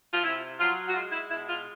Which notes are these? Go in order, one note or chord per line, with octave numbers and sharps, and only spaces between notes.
F4
C3 E4
F#3 F4
F#4
G#3 F4
E4
B2 E4
F4